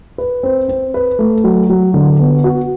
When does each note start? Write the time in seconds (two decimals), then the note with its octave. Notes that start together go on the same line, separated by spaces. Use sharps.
0.18 B4
0.43 C4
0.68 C4
0.94 B4
1.19 A3
1.44 F#3
1.70 F#3
1.94 D3
2.19 B3
2.44 F#4